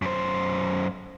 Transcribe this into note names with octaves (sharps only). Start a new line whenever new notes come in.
F#2 C5